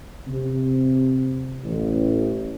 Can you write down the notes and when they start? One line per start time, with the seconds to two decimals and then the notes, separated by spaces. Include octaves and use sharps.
0.28 C3
1.65 A1